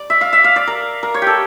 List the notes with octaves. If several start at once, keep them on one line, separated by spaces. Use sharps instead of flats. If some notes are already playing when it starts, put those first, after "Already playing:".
Already playing: D5
E5
F5
E5
F5
D5
A#4
A#4
C#5
G4 A4